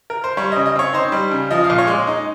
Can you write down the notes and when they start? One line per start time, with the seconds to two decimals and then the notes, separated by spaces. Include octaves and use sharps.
0.10 A#4
0.24 C5
0.37 G3 C#5
0.52 C#3 D#5
0.66 D#5
0.76 C4 C#5
0.93 D#4 C5
1.12 G3
1.32 C#3
1.51 F3 D#5
1.64 F5
1.70 A#2
1.78 C#5
1.87 G#3
2.07 D#4